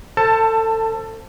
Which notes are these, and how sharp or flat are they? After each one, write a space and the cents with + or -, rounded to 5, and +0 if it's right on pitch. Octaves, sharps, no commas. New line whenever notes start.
A4 +25 C5 +0 A5 +10